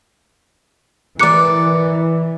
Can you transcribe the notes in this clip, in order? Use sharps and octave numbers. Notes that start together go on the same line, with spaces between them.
E3 A#4 D5 D6 F#6 C#7